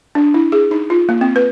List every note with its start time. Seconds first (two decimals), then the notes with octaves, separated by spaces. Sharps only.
0.15 D4
0.34 E4
0.52 G#4
0.71 D#4
0.90 F4
1.09 A#3
1.21 C4
1.36 B4